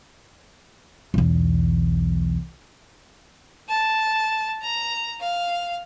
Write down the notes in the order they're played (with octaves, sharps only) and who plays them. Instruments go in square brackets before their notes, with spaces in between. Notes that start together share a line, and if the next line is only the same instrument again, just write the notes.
[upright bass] B1 E2
[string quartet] A5
A#5
F5